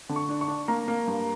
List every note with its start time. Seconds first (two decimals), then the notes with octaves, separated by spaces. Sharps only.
0.09 D3
0.16 C#6
0.29 D4
0.41 C#6
0.48 D4
0.68 A#3 A#5
0.88 A#3
1.07 G2